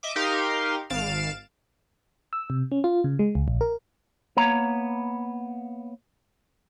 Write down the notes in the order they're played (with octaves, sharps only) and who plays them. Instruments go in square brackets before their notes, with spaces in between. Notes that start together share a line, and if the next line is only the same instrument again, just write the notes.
[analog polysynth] D#5 E5 D6
D#4 G4 A#4 F5 C6
G#1 F5 A6 D7 E7
[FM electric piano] E6
C3
C#4
F4
C#3
G#3
C#2
A#1
A#4
[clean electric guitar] A#3 B3 C#5 A#5